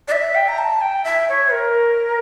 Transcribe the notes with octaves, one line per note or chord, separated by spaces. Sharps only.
D5
E5
G5
A#5
A5
G5
E5
C#5
A#4